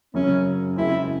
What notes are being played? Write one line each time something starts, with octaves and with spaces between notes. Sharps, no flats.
F#2 C#3 F#3 C#4
F#2 C#3 G#3 C4 E4